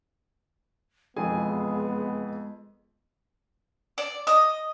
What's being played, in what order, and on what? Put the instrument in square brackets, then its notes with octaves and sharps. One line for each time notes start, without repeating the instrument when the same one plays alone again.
[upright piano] E1 G#4 [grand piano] F2 G#5 [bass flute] G#3 [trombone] B3
[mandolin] D5
D#5